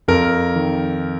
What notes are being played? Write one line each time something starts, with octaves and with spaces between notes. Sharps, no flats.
F2 A#4
D#3